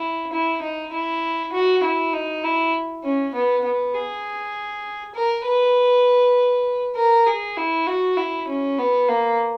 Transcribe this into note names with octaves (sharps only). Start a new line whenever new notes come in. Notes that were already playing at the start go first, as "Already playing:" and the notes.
Already playing: E4
E4
D#4
E4
F#4
E4
D#4
E4
C#4
B3
B3
G#4
A#4
B4
A#4
G#4
E4
F#4
E4
C#4
B3
A#3